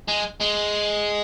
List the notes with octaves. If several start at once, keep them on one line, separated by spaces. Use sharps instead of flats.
G#3
G#3